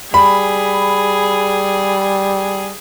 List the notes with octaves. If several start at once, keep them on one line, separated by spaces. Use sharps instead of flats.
G3 G#4 B5